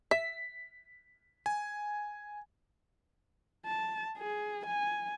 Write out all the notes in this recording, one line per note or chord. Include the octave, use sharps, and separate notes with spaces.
E5 B6
G#5
A5
G#4
G#5